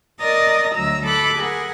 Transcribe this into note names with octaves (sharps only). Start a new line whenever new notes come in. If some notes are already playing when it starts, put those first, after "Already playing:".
A#4 D5 D#5 D#6 A6 A#6
D2 F#3 A#5 E6
A4 B5 D6 F#6
G#4 A#4 F#5